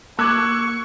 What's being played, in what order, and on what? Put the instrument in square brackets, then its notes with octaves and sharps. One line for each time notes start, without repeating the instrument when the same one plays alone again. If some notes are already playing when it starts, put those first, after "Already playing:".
[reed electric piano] A#3 [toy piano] A5 D6 [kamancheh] C#6 [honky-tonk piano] E6 F#6 G#6